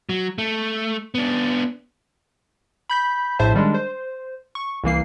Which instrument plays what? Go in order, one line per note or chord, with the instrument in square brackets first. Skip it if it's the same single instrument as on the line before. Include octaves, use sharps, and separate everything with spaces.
[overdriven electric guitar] F#3
A3
B3 D4
[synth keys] B5 G6 B6
A#1 A2 C5 E5 A5
D#3 G3 G#3 D4
C5
C#6
C2 E3 A#3 C7